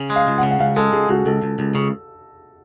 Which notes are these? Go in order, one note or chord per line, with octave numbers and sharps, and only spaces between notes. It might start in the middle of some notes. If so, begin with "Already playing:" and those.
Already playing: C#3
G#3
F5
C#2
F#5
C#3
F#5
C#2 F5
G#3 A4
C#2 G#4
C#2 F#4
C#2 A4
C#2
C#2
C#3